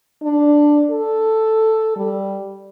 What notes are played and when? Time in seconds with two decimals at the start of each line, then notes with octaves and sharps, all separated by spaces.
0.22 D4
0.91 A4
1.96 G3